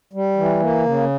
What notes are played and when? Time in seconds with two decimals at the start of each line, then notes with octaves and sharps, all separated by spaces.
0.13 G3
0.36 E3
0.60 A#3
0.84 C#3